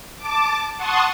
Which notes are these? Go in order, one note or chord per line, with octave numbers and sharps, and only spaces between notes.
A5 D6
F#5 A5 C6 C#6 D#6